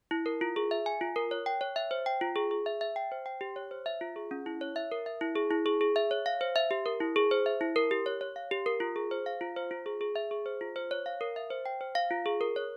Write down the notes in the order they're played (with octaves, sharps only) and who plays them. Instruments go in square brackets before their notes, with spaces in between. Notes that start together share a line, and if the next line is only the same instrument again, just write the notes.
[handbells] E4
A#4
F4
G#4
E5
G#5
F4
A#4
C#5
G5
C#5
E5
C5
G5
F4
G#4
G#4
E5
E5
G5
C5
G5
G4
C#5
C5
E5
F4
G#4
C#4
E4
C#5
E5
A#4
E5
E4
G#4
E4
G#4
G#4
E5
C#5
F5
C5
E5
G4
A#4
E4
G#4
C5
E5
E4
A#4
G4
C#5
C#5
F5
G4
A#4
F4
G#4
C5
F5
F4
C5
F4
G#4
G#4
E5
G#4
C5
F4
C5
C#5
F5
A#4
E5
C5
G5
C5
F5
F4
G#4
A#4
C#5